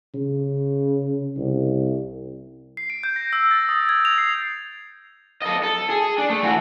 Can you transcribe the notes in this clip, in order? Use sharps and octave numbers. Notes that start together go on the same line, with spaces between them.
C#3
C2
C7
D7
G6
A#6
E6
A6
D#6
G#6
F7
C7
A4 D#5
A4
G#4
D4
A3
E3 F#4